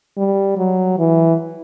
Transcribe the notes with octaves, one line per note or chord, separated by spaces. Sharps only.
G3
F#3
E3